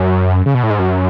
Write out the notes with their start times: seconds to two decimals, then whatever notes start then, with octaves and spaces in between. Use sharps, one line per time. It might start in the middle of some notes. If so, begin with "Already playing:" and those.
Already playing: F#2
0.46 C#3
0.54 B2
0.63 A2
0.70 G#2
0.79 F#2